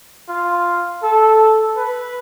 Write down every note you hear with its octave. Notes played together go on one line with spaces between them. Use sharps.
F4
A4
B4